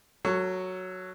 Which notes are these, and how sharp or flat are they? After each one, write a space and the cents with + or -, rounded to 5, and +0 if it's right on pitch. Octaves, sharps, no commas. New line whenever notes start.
F#3 +0 A4 +30 C#6 +0